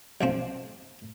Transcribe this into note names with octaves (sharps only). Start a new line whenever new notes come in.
B1 F3 C4